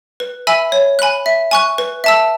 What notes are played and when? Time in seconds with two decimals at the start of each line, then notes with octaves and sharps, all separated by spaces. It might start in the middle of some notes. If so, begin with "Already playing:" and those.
0.20 B4
0.47 E5 G#5 B5 E6
0.72 C#5
0.99 G#5 B5 F#6
1.26 E5
1.51 G#5 C#6 F#6
1.78 B4
2.04 E5 A5 E6